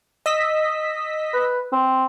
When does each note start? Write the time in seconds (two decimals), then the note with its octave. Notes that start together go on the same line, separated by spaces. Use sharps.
0.26 D#5 E6 B6
1.33 B4
1.72 C4